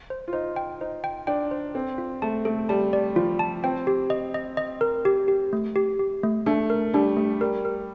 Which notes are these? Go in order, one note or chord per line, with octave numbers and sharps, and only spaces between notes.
C5
F4
D#4 C5
G5
D#4 C5
G5
D4 G5
C5
C4 A4
F4
A3 A5
A3 A4
G3 A5
D5
F3 F4
A5
C4 G5
G4
D#5
D#5
D#5
A#4
G4
G4
A3
G4
G4
A3
A3 D4
A#4
G3 D4
A3
G3 A#4
A#4